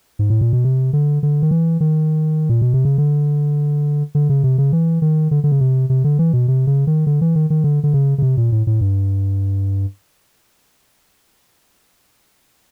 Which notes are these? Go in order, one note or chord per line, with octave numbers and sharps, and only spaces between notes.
G#2
A2
A#2
B2
C3
D3
D3
D#3
E3
D#3
A#2
B2
C3
C#3
D3
D3
C#3
C3
C#3
E3
D#3
D3
D3
C#3
C3
C3
D3
E3
B2
C3
C#3
D#3
D3
E3
D#3
D#3
D3
D3
C#3
C#3
C3
A#2
A2
A2
G2